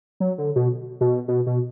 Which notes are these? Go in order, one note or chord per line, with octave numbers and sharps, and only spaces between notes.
F#3
D3
B2
B2
B2
B2